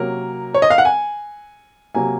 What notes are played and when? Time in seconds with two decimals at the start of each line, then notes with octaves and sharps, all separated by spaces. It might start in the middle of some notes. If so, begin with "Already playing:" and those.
Already playing: C3 F#3 A#3 C#4 A#4
0.54 C#5
0.62 D#5
0.70 F5
0.78 F#5
0.85 G#5
1.94 C3 F#3 A#3 G#5